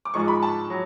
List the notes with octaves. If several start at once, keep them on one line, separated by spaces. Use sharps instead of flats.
D6
G#2 F3 G#3 C#6
B5
A5
F#3